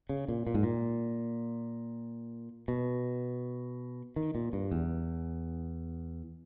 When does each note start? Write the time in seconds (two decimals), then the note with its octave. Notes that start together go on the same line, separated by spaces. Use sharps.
0.09 C#3
0.28 A#2
0.47 A#2
0.55 G#2
0.63 A#2
2.68 B2
4.16 D#3
4.35 A#2
4.53 G2
4.72 E2